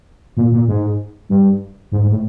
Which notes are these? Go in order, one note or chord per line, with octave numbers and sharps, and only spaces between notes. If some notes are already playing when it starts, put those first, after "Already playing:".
A#2
A#2
G#2
G2
G#2
G#2
A2